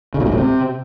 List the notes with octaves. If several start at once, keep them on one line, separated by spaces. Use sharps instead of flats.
C#3
A#2
G2
A2
C3